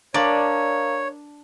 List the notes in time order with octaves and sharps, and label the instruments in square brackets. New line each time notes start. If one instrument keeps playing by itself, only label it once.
[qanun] D4 [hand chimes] A#4 F5 A#5 [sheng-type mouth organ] C#5 [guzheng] D5